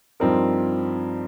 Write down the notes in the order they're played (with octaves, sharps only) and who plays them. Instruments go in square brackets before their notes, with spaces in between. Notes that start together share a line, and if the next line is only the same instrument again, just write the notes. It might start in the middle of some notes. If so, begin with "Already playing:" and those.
[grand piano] G2 F3 C4 D#4 A#4